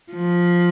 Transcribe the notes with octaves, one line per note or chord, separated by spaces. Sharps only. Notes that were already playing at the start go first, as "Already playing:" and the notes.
F3